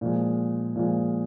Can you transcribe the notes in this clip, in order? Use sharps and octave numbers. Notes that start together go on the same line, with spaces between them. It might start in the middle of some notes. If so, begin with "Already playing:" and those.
A#2 F3 G#3
A#2 F3 G#3